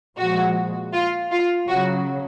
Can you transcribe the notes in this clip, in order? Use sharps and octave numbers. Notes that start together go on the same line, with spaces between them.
A#2 F3 G#3 F#4
F4
F4
C#3 F#3 F#4